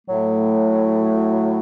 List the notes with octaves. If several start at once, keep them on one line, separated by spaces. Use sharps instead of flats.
A2 F#3 A3